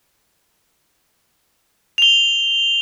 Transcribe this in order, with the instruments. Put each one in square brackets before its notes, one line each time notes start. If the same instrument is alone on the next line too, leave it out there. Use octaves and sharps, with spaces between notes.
[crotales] F7 G7